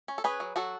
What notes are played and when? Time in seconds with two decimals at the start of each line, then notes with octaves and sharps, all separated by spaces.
0.08 C#4
0.18 A4
0.24 C#4 G#4 B4
0.40 F#3
0.56 F#3 F#4 A4